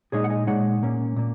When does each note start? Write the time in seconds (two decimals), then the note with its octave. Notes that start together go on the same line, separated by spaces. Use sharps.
0.12 A#2 G#3 D#4 G#4 C#5
0.24 F#5
0.30 D#5 G#5
0.47 A#2 G#3 D#4 C#5 F#5
0.83 A#2 A#3 C#4
1.16 A#2 A#3